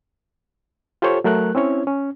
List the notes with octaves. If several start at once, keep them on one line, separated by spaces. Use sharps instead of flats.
F4 G4 A4 C5 C#5
F#3 A3 A#4 F#6
C4 C#4 E4 C#5
C#4